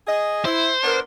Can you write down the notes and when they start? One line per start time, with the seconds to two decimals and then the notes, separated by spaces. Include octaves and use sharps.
0.07 G#4 D#5
0.45 E4 C5
0.83 B3 D4 A#4